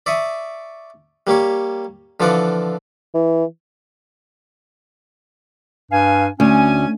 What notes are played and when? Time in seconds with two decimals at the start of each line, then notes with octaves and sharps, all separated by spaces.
0.06 D5 E5 C#6 D#6
1.27 G3 A#3 G4 C#5
2.20 D3 E3 F3 F4 D5 F#5
3.14 E3
5.92 G2 F5 G#5
6.40 D2 C#4 G#5